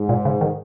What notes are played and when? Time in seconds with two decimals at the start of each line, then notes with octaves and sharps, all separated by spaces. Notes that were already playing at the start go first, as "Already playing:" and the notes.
Already playing: G#2
0.09 A#2
0.25 C#3
0.41 D#3